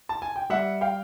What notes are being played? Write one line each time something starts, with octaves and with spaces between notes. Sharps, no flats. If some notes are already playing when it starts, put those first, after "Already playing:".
A5
G#5
G5
G3 E5 F#5
F5 G5